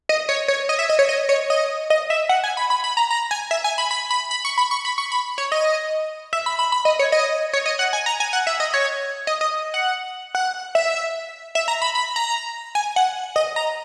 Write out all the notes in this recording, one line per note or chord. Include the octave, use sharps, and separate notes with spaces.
D#5
C#5
C#5
D#5
E5
D#5
C#5
D#5
C#5
D#5
D#5
E5
F#5
G#5
B5
B5
B5
A#5
A#5
G#5
E5
G#5
B5
B5
B5
B5
C#6
B5
C#6
B5
C#6
B5
C#5
D#5
E5
B5
B5
B5
D#5
C#5
D#5
C#5
D#5
F#5
G#5
A#5
G#5
F#5
E5
D#5
C#5
D#5
D#5
F#5
F#5
E5
E5
A#5
B5
B5
A#5
G#5
F#5
D#5
A#5